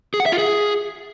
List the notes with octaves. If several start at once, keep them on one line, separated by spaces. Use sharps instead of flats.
G#4
F#5
E5
F4
G#4